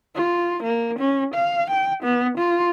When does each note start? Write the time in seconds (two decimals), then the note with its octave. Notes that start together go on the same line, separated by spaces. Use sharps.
0.15 F4
0.63 A#3
0.98 C#4
1.34 F5
1.70 G5
2.03 B3
2.37 F4